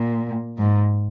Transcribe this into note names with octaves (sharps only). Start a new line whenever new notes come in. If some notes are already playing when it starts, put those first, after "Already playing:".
Already playing: A#2
G#2